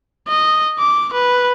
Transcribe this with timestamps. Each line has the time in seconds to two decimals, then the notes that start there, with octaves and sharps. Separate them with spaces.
0.28 D#5
0.79 D6
1.14 B4